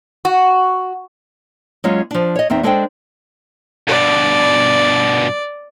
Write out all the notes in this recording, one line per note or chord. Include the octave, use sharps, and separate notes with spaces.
F#4
F#3 G#3 C#4 F4
F3 D4
C#5 D#5
E2 C4 D#4 E5
G#3 D4 A4 C5 F5 G5
G2 B2 D5